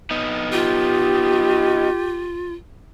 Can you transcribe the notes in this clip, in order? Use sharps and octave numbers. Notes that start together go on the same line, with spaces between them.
B3 D#4
F4 G4